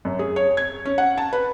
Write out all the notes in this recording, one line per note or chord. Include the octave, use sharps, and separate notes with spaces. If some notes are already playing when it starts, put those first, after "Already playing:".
F#2
G#4
C#5
G#6
C#4
F#5
A5
B4